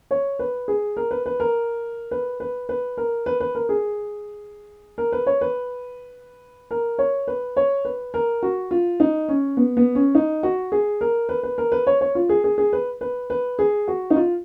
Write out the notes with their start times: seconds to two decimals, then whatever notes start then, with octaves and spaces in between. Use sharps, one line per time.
0.11 C#5
0.39 B4
0.68 G#4
0.97 A#4
1.11 B4
1.26 B4
1.40 A#4
2.11 B4
2.40 B4
2.69 B4
2.97 A#4
3.26 B4
3.40 B4
3.55 A#4
3.69 G#4
4.98 A#4
5.12 B4
5.26 C#5
5.41 B4
6.71 A#4
6.99 C#5
7.28 B4
7.57 C#5
7.85 B4
8.14 A#4
8.43 F#4
8.71 F4
9.00 D#4
9.29 C#4
9.57 B3
9.77 B3
9.95 C#4
10.15 D#4
10.43 F#4
10.72 G#4
11.01 A#4
11.29 B4
11.43 B4
11.58 A#4
11.72 B4
11.87 C#5
12.01 C#5
12.15 F4
12.29 G#4
12.44 G#4
12.58 G#4
12.73 B4
13.01 B4
13.30 B4
13.59 G#4
13.88 F#4
14.10 D#4
14.16 F4